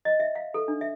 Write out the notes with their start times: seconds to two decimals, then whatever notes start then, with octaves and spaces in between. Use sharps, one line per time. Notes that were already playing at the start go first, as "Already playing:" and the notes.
0.05 D#5
0.20 E5
0.35 F5
0.54 A4
0.68 D4
0.81 E5